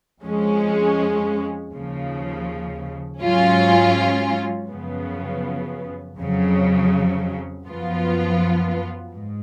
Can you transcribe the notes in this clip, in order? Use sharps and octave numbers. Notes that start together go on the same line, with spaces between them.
F2 F3 G#3 C#4
D#2 C#3 F3
G#2 F#3 C#4 F4
F#2 C#3 F3 B3
F2 C#3 F#3
F#2 F3 B3 F4
G#2